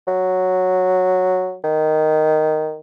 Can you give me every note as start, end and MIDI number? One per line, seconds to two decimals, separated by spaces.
0.08 1.56 54
1.64 2.80 51